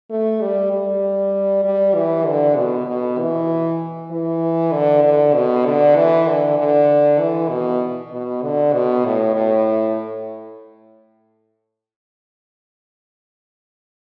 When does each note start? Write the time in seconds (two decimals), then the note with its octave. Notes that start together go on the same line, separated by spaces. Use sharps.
0.10 A3
0.41 G3
0.72 G3
1.65 G3
1.95 E3
2.26 D3
2.57 B2
2.88 B2
3.19 E3
4.11 E3
4.73 D3
5.04 D3
5.35 B2
5.66 D3
5.96 E3
6.28 D3
6.58 D3
7.19 E3
7.50 B2
8.12 B2
8.43 D3
8.73 B2
9.05 A2
9.36 A2